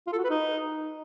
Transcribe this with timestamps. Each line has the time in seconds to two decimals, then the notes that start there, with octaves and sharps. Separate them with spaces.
0.07 F4
0.13 A4
0.19 F#4
0.24 B4
0.30 D#4